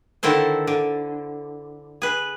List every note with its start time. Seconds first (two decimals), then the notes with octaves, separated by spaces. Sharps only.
0.23 D3 D#3 E4 A4 C5
0.67 D3
2.02 G#4 B4